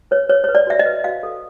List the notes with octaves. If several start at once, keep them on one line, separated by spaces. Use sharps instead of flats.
B4 C#5
B4 C#5
B4 C#5
D5
F#4 E5
D#5
B4
F#4 F5
A4